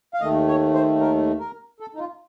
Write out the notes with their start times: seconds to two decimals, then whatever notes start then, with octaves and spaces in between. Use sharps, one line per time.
0.14 F5
0.21 D#2 D#3 A3 D#5
0.48 C#5
0.74 C5
1.00 A#4
1.40 A#4
1.80 A4
1.95 D#4
1.99 F4